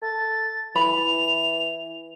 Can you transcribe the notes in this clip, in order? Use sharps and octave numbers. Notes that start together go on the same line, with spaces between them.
A4 A6
E3 B5 F7